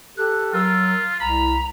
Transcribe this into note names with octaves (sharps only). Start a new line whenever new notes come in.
G4 A4 F#6
F#3 F4 A#4 E6
C2 A#5 B5